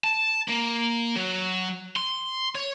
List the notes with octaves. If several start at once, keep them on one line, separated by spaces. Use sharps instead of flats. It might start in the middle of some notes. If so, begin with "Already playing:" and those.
A5
A#3
F#3
C6
C#5